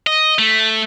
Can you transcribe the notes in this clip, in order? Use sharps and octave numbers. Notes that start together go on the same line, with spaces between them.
D#5
A3